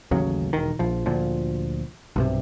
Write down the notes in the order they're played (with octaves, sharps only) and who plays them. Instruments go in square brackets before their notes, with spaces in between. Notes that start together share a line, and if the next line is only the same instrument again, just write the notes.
[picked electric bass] A1 D#2 C#3 F#3
E1 D#3
A#1 F3
D2 A#2 F3
B1 G2 C3